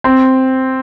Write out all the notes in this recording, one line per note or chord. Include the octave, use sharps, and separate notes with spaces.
C4